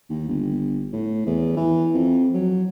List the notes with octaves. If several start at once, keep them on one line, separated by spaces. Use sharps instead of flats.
D#2
G1
A2
E2
E3
F2
F#3